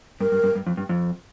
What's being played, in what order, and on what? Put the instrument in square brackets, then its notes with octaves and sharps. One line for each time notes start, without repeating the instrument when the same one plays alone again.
[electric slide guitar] G2 [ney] A#4
[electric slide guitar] G2
G2
G2
F2
G2
F2